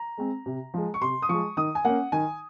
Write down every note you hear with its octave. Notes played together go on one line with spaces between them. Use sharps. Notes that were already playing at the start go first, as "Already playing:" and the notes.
Already playing: A#5
G#3 C4
C3
F3 G#3
C#6
C3 C6
D#6
F3 G#3 C#6
D#3 D#6
G#5
A#3 C#4 F#5
D#3 G#5